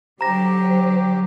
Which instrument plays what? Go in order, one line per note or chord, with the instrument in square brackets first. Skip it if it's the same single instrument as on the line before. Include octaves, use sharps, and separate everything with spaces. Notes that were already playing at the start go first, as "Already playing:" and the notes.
[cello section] D3 F#3 [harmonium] G4 [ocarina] C5 [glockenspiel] A#5 A#6